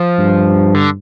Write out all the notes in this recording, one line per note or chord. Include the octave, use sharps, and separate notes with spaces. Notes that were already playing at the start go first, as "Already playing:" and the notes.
Already playing: F3
G2
D3